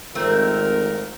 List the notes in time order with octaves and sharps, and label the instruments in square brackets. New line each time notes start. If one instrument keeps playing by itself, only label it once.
[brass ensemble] G#1 F4 A#4 [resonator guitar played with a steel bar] A3 C4